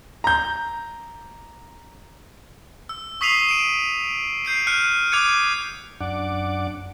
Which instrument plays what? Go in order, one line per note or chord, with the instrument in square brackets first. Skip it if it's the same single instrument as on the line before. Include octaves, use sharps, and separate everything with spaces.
[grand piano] A#5 G6
[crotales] E6
C#6 D#6 B6 C7 D#7 F7
D7 E7
G6 C7 D7
F6 F#6 C#7 D#7
D6 F#6 G#6 C#7 D#7
[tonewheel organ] F#2 D4 F#5 D6